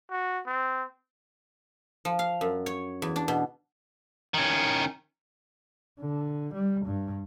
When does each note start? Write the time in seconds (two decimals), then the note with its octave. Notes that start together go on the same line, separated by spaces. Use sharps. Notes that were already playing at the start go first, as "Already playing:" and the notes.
0.11 F#4
0.47 C4
2.05 F3
2.19 F5
2.41 F#2
2.66 C#5
3.02 E2
3.16 D4
3.28 B2
4.34 D#3 C#4
6.01 D3
6.54 G3
6.86 G2